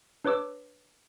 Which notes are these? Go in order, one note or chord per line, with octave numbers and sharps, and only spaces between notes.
D4 B4 C#5 D6 E6